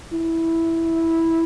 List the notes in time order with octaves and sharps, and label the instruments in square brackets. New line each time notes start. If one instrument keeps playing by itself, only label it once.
[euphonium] E4